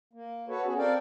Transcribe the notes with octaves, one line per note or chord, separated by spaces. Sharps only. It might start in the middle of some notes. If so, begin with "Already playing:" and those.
A#3
F#4 A4 B4 C#5
B3 C#4 F#4 G#4
C4 A4 A#4 D5 F5 G5